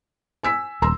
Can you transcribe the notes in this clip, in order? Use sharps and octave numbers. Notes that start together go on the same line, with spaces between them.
G#5 E6 B6
D#1 A#5 C6 E6